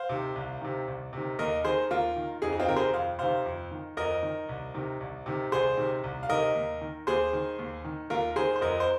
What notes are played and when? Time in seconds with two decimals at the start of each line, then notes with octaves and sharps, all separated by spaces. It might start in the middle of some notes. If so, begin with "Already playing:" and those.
Already playing: C5 F5
0.09 C3 D#3
0.36 C2
0.62 C3 D#3
0.87 C2
1.13 C3 D#3
1.39 D#2 A#4 D#5
1.65 D#3 G#4 C5
1.91 D#2 F4 A#4
2.16 D#3
2.42 F2 D#4 G#4
2.53 D#4
2.59 C4 F4
2.68 C3 D#3 A#4
2.76 G#4 C5
2.94 F2 F5
3.19 C3 D#3 C5 F5
3.46 F2
3.71 D#3
3.97 F2 A#4 D#5
4.23 D#3
4.49 C2
4.74 C3 D#3
5.00 C2
5.26 C3 D#3
5.52 C2 G#4 C5
5.77 C3 D#3
6.04 C2
6.23 F5
6.30 C3 D#3 A#4 D#5
6.55 D#2
6.81 D#3
7.07 D#2 G#4 C5
7.33 D#3
7.59 D#2
7.84 D#3
8.10 D#2 F4 A#4
8.36 D#3 G#4 C5
8.56 C5
8.61 F2 A#4 D#5
8.80 C5